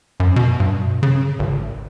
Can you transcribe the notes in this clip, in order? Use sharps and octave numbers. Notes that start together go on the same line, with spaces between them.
F#2
B2
G2
C#3
G#1